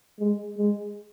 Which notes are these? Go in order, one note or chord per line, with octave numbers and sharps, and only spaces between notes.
G#3
G#3